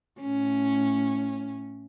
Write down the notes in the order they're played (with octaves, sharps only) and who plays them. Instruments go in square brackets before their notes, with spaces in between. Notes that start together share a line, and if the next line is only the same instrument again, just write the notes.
[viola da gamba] A2 C#4